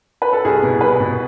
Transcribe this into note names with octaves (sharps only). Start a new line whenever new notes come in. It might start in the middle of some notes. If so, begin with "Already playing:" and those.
B4
A4
C2 G#4
B2
C2 B4
B2